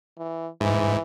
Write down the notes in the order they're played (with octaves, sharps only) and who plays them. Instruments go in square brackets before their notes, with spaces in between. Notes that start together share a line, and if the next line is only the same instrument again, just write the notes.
[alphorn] E3
[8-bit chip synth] G#2 [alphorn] E3